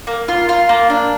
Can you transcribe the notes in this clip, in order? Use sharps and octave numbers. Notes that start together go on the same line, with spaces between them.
A#3
F4
F4
A#3
D4